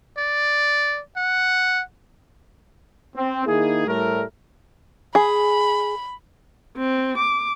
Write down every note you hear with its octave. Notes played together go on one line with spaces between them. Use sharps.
D5
F#5
C4
D#3 A#3 D#4 E4 G#4
A2 G3 A3 A#4
G#4 B5
C4
D6